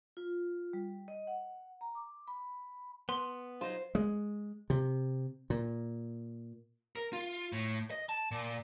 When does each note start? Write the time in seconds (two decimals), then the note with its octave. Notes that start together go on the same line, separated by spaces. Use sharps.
0.17 F4
0.73 G3
1.08 D#5
1.27 F#5
1.81 A#5
1.95 D6
2.28 B5
3.09 B3 C6
3.61 F#3 D#4 F4 C5
3.95 G#3
4.70 C3
5.50 A#2
6.96 A#4
7.13 F4
7.53 A2
7.91 D#5
8.09 A5
8.31 A#2